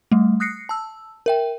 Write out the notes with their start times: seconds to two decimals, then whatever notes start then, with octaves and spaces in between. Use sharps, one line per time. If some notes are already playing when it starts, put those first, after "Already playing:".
0.12 G3 A3
0.40 D#6 F#6 A#6 C7 C#7
0.69 A5 E6
1.26 A#4 E5 G5